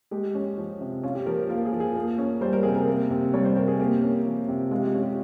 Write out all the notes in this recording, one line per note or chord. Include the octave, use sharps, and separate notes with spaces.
G#3 G4
C#4
F3
C3
C#4 F4
G4
F3 A#4
A#3 F4
G#4
F3
G#4
A#3
C#4
G3 C5
A#4
C3 G#4
A#4
A#3
C3
G3 C#5
C5
C3 A#4
G#4
A#3 G4
C#4
F3
C3
G#3 F4
G4
F4
C#4
G4